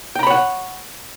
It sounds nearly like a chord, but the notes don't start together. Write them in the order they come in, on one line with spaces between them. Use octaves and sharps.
G5 A#5 B5 C#5 F#5